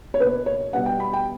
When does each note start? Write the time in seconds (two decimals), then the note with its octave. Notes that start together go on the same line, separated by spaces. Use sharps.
0.14 C#5
0.19 B2 A#3 D4 B4
0.46 C#5
0.73 B2 G3 B3 D4 F#5
0.86 G5
1.00 B5
1.13 G5